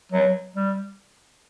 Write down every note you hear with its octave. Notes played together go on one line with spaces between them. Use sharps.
F#3
G3